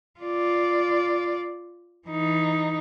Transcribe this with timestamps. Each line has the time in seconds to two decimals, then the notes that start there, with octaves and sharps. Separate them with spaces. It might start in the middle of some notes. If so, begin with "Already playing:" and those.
0.20 F4 D5
2.08 E3 D#4